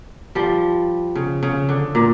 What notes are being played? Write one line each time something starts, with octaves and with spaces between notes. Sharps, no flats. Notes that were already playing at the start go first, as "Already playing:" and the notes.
F3 G3
C#3
C#3
D3
A#2